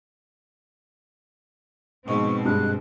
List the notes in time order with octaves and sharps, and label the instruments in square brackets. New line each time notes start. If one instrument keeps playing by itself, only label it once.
[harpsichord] G#2 [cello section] B2 F3 C4 [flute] C#6
[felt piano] G2 G#3 [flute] F#6